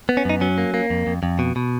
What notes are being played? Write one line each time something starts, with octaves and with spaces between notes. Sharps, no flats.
B3
C#4
F#2 D#4
F#3 C#4
A#3
A#3
F2
F2
F2
B2
B2